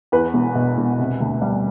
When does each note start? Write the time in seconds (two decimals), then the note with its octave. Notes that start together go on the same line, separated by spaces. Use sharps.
0.12 E2 B4
0.34 E1
0.55 B2
0.78 E1
0.99 C3
1.20 D2
1.42 G3